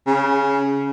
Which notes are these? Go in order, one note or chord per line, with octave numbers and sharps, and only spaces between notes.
C#3